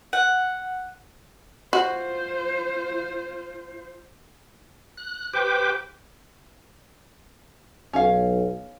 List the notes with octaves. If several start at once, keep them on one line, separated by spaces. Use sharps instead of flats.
F#5
F4 F#4 C5
F#6
G4 B4 C5 G5 D6
B1 C#4 F5